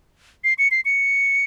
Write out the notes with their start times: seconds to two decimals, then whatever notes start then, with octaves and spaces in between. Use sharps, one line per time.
0.44 C7
0.58 C#7
0.71 C7
0.85 C#7